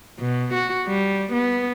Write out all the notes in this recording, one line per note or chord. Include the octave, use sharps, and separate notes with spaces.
B2
F#4
G3
B3